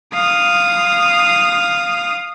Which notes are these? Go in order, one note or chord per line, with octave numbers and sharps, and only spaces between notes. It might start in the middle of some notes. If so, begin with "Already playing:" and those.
F5 D#6